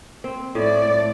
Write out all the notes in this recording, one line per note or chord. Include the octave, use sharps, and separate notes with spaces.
C4
A2 A3 D5